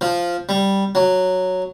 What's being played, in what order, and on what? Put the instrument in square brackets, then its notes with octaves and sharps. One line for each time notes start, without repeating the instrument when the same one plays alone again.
[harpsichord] F3
G3
F#3